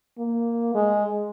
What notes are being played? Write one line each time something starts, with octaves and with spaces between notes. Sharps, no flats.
A#3
G#3